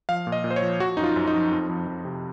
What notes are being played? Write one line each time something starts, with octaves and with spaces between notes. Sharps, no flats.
F3 F5
A#2
D#5
A#2
C5
C#5
F3
F3 F#4
F#2 D#4
F4
F#2
D#4
F3
F2
F2
F3
C3